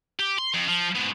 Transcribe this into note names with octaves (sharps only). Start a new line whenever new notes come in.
G4
C6
F2
F3
G#2 B2